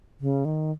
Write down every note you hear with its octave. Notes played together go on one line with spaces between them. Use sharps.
C#3
D#3